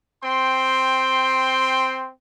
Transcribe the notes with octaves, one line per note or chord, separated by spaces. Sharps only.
C4 G5 C6